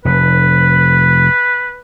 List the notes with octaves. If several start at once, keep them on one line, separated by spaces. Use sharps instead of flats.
F1 B4